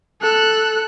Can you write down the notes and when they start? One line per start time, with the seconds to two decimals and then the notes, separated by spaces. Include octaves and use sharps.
0.22 A4 F#6